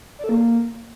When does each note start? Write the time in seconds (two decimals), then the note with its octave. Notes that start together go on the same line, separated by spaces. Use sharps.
0.19 D5
0.24 A4
0.29 A#3